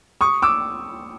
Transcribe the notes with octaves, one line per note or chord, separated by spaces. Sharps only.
C#6 D#6
D6 E6